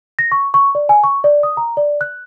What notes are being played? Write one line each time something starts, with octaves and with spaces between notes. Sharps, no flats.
A#6
C#6
C#6
D5
G#5
C#6
D5
D#6
A#5
D5
F#6